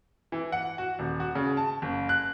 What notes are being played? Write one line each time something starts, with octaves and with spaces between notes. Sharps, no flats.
E3
F#5
F#4
D#1
F#4
C#3
A5
F#1
F#6